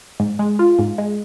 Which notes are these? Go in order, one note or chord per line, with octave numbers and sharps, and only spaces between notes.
G#2
G#3
F4
G#2
G#3